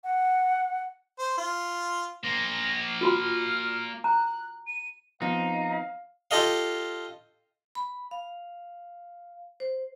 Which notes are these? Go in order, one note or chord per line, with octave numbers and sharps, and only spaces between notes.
F#5
C5
F4
A#3 C5 A#6
F4 F#4 B5 F6
A#5 F#6
D#7
F3 B3 C4 D#4 F5
F4 G4 A4 D#5 F5
B5
F5
C5